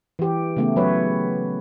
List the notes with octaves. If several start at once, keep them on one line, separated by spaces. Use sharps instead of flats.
E3 G4
C#3 A3 B3
F#3 B4 C#5